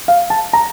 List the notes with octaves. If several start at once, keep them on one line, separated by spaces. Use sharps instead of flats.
F5
A5
A#5